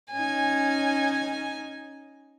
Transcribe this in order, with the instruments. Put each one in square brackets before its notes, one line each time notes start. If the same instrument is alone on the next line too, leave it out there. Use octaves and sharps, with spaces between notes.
[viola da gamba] C#4 D#4 [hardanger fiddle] G#5